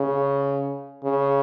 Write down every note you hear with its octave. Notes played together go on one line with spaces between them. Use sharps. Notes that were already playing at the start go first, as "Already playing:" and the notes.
Already playing: C#3
C#3